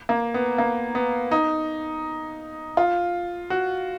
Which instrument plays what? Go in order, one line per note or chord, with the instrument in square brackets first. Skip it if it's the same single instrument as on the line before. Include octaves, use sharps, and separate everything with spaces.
[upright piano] A#3
B3
A#3
B3
D#4
F4
F#4